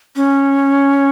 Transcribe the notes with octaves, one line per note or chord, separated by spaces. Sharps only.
C#4